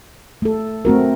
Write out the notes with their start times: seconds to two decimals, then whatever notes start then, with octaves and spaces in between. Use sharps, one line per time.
0.42 A3 A4
0.85 A3 C4 F#4 A#4